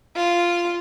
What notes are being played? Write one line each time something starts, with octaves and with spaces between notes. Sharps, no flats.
F4